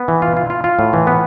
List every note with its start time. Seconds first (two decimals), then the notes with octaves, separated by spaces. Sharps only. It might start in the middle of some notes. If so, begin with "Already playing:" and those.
Already playing: B3
0.08 E3
0.22 F4
0.37 F4
0.50 F4
0.64 F4
0.79 A2
0.93 E3
1.07 B3